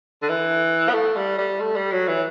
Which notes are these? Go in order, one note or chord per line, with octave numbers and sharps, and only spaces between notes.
D3
E3
B3
A3
G3
G3
A3
G3
F#3
E3